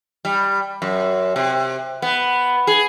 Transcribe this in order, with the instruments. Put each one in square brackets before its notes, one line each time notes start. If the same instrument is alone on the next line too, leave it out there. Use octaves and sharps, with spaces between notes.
[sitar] G3
F#2
C3
B3
G#4